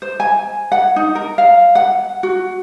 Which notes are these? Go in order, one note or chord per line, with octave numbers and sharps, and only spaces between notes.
C5
G#5
F#5
D#4
A#4
F5
F#5
F#4